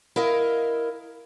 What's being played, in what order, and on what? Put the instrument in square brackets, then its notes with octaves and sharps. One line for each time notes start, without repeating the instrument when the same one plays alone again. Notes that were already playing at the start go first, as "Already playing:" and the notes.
[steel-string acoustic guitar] E4 A#4 D#5 F5